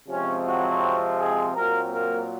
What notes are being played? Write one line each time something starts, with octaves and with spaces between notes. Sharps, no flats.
C3 F3 G#3 C4 C#4
F#3 F#4
G#3 G#4
A#2 F#3 A#3 C4 A#4
A#3 A#4